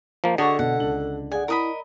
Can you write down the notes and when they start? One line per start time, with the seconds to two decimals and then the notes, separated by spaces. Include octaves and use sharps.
0.24 F3 A#3
0.38 D3 F#4 G#4 A4 C#5 D#5 A5 D6
0.59 B2 F#5
0.78 C#2 D4 F#7
1.32 G#4 D5 F#5 G#5
1.48 E4 A#4 D#5 B5